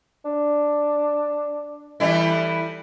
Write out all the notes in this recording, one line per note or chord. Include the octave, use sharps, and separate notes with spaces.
D4
E3 G3 A3 E4